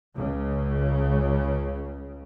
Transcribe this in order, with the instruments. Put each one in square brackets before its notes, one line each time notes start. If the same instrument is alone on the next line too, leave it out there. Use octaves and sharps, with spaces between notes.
[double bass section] C#2 C#3